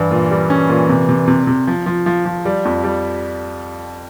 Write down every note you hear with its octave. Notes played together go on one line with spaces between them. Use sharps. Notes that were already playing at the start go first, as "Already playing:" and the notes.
Already playing: G2 E3
A#2
G3
C#4
A#2
C3
C3
C3
C3
F3
F3
F3
F3
G3
F2
G3